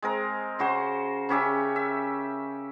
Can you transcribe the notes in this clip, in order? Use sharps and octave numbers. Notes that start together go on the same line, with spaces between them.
G#3 C4 A#4
C#3 F#4 C5
C#3 C#4 G4 E5
E5